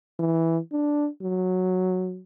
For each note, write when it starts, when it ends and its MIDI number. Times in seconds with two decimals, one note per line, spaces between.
0.19 0.59 52
0.72 1.08 62
1.22 2.21 54